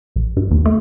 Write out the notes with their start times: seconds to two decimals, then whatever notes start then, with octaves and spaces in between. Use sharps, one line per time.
0.16 A#1
0.37 G2
0.51 D#2
0.66 A3